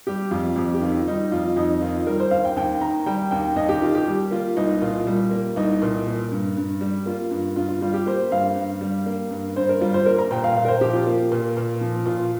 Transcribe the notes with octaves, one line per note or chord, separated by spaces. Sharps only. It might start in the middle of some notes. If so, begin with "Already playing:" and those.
G3 G4
F2 F4
F2 G4
G4
D#3 F4
G3 D#4
F2 F4
F2 D#4
D#3 F4
G3 A#4
C5
D#2 F5
G5
D#2 G5
D#3 A#5
G3 G5
D#2 G5
D#2 D#5
G4
D#3 F4
G4
G3
A#3 F4
C2 D#4
A#2 F4
G3
A#3
C2 D#4
A#2
A#3
G2
G2
G3
A#3 F4
G2
G2 F4
F4
G3 F4
G4
A#3 C5
G2 F5
G2
G3
A#3
G2
G2 C5
A#4
G3 F4
C5
A#3 A#4
A#5
A#2 G5
F5
A#2 F5
A#4
C5
F3 G4
F4
A#3
A#2
A#2
F3
A#2 F4